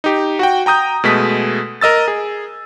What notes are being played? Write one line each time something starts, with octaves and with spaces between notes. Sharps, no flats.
D#4 G4
F#4 F#5 G5
G5 A#5 D#6 G6
B2 G#3 A3 B6
A#4 D#5 E6 A6
G#4